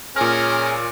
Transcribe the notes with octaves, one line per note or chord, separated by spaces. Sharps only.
A#2 C#4 G#4 A#4 F6